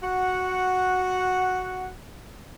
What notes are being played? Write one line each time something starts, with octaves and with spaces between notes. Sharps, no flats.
F#4 F#5